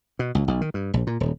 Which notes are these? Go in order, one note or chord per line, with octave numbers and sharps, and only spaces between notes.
B2
C#2
B1
D#3
G2
A#1
A#2
D#1